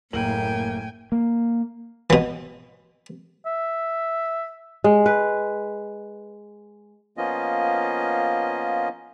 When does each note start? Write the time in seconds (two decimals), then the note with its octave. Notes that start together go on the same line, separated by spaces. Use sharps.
0.13 F#1 A2 A#3 G5 G#5 F#7
1.12 A#3
2.10 B2 E3
3.46 E5
4.84 G#3
5.06 B4
7.17 F3 A#3 B3 C#4 F4 D#5